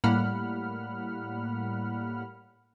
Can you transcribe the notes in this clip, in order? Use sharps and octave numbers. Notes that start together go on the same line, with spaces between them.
A2 G3 A#3 F#5 B5 F6